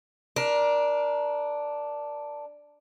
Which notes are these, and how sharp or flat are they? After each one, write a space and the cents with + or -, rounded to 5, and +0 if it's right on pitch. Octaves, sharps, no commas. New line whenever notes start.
D4 +0 A#4 +20